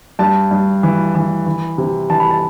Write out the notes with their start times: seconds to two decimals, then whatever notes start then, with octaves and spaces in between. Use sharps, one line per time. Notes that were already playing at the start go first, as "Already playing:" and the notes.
0.19 G2 A5
0.51 G2
0.83 E3
1.15 E3
1.46 E3
1.78 C3
2.10 E3 A5
2.20 B5
2.31 A5